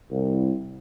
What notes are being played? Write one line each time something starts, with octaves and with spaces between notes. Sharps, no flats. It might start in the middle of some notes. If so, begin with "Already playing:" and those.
C2